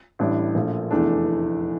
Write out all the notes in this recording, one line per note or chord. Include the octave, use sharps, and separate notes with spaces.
A1 A2 G3 D4
A#1 A#2 A3
F1 E2 E3 A3 D4